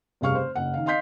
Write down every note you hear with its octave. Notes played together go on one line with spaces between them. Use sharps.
F1 G2 C#3 F5 C#6 F6
C5
F#1 F#5
D#3 F5
D#5 F5 C6 G6 B6 C7